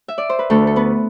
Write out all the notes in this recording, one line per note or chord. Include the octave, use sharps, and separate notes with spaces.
E5
D5
C5
B4
D2 A3 A4
A4
B3 B4